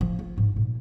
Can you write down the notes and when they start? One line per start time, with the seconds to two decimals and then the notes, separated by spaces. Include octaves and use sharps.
0.01 F3
0.19 F4
0.38 G#2
0.56 A#2